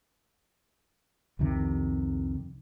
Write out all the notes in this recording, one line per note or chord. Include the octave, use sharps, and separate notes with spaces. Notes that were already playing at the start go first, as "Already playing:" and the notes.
C2 F2 C3 D#3